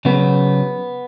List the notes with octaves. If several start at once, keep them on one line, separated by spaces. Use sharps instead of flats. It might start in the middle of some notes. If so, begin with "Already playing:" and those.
C#3 F#3 B3